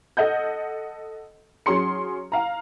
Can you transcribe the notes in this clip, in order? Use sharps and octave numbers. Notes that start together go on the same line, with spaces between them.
A4 D#5 F#5 G6
F#3 C#4 G#4 C6 C#7
F5 A#5